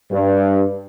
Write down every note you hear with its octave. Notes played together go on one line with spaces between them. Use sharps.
G2